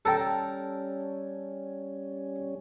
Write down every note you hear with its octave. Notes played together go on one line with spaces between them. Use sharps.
G3 C#4 A4 A#4 G5